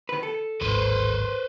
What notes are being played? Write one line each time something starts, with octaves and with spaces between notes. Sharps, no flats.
D#3 B4
A4
D1 G#1 B4 C5